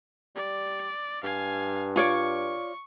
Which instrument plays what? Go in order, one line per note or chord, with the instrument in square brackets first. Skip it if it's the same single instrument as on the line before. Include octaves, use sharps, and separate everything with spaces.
[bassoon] G3 [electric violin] D5
[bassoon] G2 [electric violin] F5 G#5
[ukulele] F4 C#5 D5 [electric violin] C#6